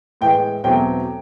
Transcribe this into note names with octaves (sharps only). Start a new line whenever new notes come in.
A2 E3 G#3 G5
E2 B2 F#3 A3 C4 G5